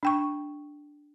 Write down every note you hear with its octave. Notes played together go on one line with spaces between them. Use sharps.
D4 G5 C#6